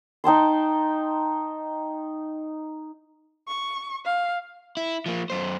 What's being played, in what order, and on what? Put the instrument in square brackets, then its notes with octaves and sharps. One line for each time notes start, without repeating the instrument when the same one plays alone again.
[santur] D#4 G5 A5 C6
[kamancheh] C#6
F5
[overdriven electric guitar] E4
F3 A#3
F#2 C5